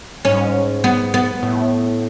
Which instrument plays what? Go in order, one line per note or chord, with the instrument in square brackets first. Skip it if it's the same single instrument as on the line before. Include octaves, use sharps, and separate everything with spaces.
[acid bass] G#2 [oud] C#4
[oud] B3
B3
[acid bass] A2